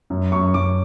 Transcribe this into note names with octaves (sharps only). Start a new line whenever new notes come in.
F#2
F#2 C#6
F#2 D6